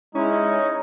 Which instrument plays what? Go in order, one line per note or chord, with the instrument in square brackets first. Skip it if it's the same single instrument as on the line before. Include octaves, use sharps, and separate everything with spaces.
[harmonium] G#3 E4 [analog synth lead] C#4 [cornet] D#4